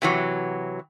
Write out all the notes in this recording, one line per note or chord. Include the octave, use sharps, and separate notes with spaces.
C3 E3 F#3